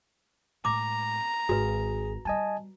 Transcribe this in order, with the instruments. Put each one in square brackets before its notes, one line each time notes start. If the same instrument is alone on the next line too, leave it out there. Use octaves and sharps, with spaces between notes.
[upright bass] A2 G#3 [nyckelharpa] A#5 [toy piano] D6
[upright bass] G#1 [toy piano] F#4 B4 [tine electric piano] G#4
[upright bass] G3 B3 [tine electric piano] D#5 G#5 A5